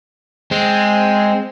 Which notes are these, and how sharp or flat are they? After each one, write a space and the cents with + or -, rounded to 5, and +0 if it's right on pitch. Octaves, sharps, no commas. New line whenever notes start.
G#3 +0 C4 +0